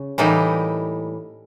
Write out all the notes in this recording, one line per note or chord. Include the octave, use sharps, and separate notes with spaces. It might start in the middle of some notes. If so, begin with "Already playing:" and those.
Already playing: C#3
A2 E3 G3 A#3 D#4